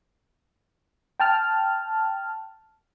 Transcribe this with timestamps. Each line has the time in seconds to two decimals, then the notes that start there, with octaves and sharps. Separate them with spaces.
1.20 G5 A5 F6